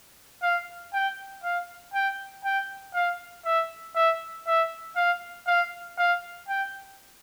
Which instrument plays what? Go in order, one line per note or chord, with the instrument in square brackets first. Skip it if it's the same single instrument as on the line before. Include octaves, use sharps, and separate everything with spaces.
[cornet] F5
G5
F5
G5
G5
F5
E5
E5
E5
F5
F5
F5
G5